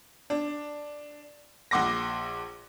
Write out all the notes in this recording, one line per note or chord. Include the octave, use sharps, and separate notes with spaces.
D4
A#1 F#5 C6 D6 A#6